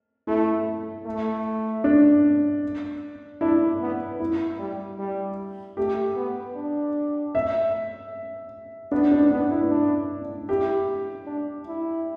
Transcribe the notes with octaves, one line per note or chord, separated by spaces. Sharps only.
A3 E4
A3
D4
D4 E4
B3
E4
G3
G3
A3 G4
B3
D4
E5
B3 D4
D4
B3 D4
E4
D4
E4 G4
D4
E4